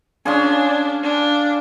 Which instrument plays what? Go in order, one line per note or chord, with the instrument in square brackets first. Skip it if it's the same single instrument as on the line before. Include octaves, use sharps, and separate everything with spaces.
[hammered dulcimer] C#4 F4 G#4 [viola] D4
[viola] D4